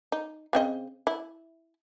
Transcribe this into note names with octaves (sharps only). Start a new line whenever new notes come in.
D#4
C#3 C4 D#5
E4